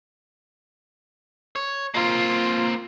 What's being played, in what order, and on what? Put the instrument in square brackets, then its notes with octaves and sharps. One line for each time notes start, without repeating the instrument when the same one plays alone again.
[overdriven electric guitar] C#5
[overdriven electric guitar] A#3 C4 [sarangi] F4